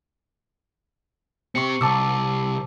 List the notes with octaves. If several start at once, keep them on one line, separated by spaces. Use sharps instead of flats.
C4 G4 C#6 C#7
C2 A5 D6 E6